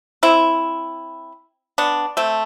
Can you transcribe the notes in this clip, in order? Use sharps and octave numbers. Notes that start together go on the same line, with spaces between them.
C4 E4
B3 D4
A3 C4